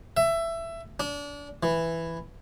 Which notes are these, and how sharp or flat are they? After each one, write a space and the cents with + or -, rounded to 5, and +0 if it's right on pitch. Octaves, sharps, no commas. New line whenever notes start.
E5 +15
D4 -30
E3 +5